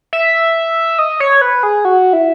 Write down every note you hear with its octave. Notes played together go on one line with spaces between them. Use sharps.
E5
D#5
C#5
B4
G#4
F#4
E4